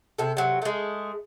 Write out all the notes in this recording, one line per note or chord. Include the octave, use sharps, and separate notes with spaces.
C3 A4
C3 F#3
G#3 A3